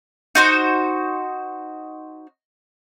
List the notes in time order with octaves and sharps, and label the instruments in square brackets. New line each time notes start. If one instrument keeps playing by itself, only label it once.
[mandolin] D#4 F#4 C5